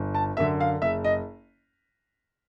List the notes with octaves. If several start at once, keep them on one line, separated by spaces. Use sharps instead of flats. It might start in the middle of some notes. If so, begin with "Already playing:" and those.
Already playing: G1
A5
F#2 D3 E5
F5
F#1 E5
D#5